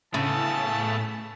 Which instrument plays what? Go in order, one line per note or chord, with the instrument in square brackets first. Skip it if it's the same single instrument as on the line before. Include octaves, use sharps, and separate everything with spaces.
[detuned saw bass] A2 [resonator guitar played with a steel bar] C#3 [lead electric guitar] A3 B3 [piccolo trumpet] A5